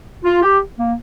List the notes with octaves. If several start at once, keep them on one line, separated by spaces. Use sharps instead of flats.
F4
G4
A#3